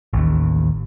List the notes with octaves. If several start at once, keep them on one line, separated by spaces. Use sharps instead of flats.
A1 D#2